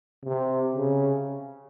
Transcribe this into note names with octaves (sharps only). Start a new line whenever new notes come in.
C3
C#3